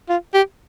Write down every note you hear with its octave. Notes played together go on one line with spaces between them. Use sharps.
F4
G4